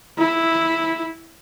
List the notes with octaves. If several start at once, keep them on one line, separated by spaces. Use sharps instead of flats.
E4